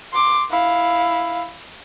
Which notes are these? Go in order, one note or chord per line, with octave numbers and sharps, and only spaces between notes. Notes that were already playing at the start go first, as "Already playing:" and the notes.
C6 D6
E4 F5